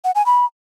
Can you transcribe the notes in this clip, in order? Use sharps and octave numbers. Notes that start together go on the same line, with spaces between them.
F#5
G#5
B5